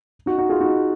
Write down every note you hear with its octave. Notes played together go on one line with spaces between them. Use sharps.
D#4 F#4
D#4 F#4
F4 G#4
D#4 F#4